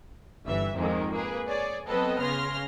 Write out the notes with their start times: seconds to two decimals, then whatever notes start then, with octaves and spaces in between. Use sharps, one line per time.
0.45 G1 E3 E5
0.76 F2 G#2 D#3 G#3 A#3
1.13 A#3 G#4 B4
1.48 G#4 C#5 D5
1.87 F#3 B3 C4 A4 B4 D#5
2.22 C#3 G#5 C6 F6 A#6